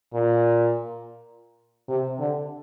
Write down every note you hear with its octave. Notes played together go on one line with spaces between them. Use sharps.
A#2
C3
D3